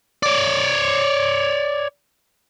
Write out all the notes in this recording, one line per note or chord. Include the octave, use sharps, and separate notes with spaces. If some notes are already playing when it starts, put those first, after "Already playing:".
C#5 D5